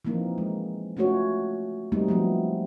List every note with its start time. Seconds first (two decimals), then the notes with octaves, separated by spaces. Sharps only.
0.05 E3 F3 A#3 C4 D#4
0.38 G#3
0.97 A3 C#4 F4 F#4 C#5
1.92 G3 A3 A#3 C4 D#4
2.08 F3 F#3 A3 B3 C4